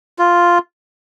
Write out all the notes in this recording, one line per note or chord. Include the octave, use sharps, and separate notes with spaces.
F4